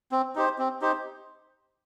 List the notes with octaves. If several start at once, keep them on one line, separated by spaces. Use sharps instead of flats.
C4
D#4 G4 C5
C4
D#4 G4 C5